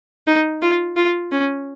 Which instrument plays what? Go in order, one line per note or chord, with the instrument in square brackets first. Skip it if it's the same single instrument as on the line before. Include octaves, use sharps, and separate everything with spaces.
[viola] D#4
F4
F4
C#4